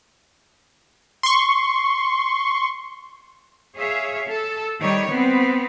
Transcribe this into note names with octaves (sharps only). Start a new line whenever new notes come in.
C6 C#6
G#4 C#5 E5 F5
A4
D#3 G3 C#5
B3 C4